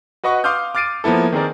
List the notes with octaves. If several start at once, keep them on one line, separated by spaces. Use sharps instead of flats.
F#4 B4 D#5 F#5 C#6 D#6
F5 C6 D6 D#6 F6 G6
D6 F6 A6 C7 D7 D#7
F3 A#3 B3 E4 A4
D#3 C4 G#4 A#4 D5